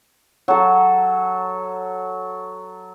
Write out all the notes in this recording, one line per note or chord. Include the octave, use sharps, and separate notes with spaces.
F#3 A4